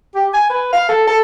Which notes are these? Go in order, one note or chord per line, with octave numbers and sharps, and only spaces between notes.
G4
G#5
B4
F5
A4
A4